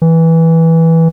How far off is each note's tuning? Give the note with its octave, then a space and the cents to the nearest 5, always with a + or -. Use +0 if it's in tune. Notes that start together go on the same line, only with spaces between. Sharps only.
E3 -10